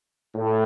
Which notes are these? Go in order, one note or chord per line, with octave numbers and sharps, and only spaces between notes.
A2